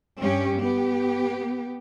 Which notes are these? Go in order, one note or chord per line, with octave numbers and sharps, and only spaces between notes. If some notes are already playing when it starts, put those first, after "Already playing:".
G2 C#4 G4
B3 G4